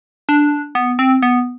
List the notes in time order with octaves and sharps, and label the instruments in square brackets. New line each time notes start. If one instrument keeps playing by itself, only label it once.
[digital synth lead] D4
B3
C4
B3